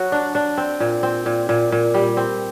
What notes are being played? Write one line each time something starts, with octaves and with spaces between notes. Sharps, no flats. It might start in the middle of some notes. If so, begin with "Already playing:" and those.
Already playing: F#3 F#4
D4
D4
C4
A#2
C4
A#2
A#2
A#2
G3
C4